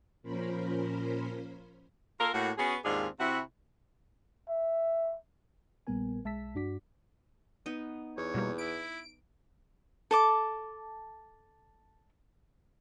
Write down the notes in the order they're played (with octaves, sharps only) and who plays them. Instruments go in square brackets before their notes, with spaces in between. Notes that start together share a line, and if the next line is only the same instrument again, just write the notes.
[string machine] A#2 F3 C#4 A#4 C5 B5
[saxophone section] A#3 F4 A4 A#4
A2 A#3 F#4
B3 C#4 F#4 G#4
D#2 G#2 C4 D4 F4 G#4
C3 E4 F#4
[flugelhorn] E5
[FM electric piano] A#1 A#2 G3 B3 A#4 G#5
B1 G#3 E5 A5 E6 B6
G2 D4 F#4 D6 B6
[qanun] B3 D#4
[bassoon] E2 [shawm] C#5
[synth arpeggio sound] B2 G3 A#3
[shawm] E4 [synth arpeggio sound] D7
[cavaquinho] A4 A5 D6